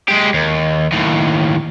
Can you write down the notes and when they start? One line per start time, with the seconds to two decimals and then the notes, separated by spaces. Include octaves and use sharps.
0.08 G#3 G4
0.34 D#2
0.92 D#2 A2